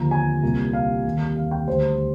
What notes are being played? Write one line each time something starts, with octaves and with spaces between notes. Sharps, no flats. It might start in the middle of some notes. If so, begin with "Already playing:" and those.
Already playing: D#2 D3 F3 A#5
G#5
C2 A#2 G3
F5
D#2 D#3 G3
F5
G5
D2 D3 G3 C5